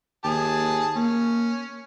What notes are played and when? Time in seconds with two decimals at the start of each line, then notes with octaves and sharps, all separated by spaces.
0.24 D#2 G#4 A5
0.96 A#3 C#4